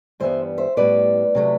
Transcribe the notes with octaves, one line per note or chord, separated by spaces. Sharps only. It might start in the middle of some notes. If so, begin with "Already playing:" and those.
G2 E3 G3 B3 C5 E5
C5 E5
A2 G3 B3 B4 D5
C3 F#3 A3